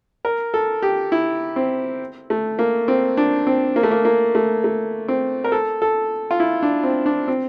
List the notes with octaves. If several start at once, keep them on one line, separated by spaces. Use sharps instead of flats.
A#4
A4
G4
E4
C4
A3
A#3
C4
D4
C4
A#3
A3
A#3
A#3
A3
A3
C4
A#4
A4
A4
F4
E4
D4
C4
D4
C4